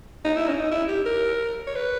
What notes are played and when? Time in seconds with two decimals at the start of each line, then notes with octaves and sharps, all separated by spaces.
0.25 D#4
0.36 E4
0.48 C#4
0.55 D#4
0.71 E4
0.88 G4
1.06 A#4
1.67 C#5
1.76 B4